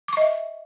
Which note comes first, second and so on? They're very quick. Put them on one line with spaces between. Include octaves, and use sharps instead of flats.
D6 C#6 D#5 E5